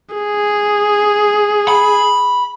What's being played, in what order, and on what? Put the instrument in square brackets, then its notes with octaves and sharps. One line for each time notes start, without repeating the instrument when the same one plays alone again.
[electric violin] G#4
[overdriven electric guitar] B5